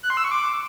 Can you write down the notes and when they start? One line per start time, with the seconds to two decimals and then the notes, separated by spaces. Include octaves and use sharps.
0.03 F#6
0.10 C6
0.17 E6
0.24 C#6
0.31 D6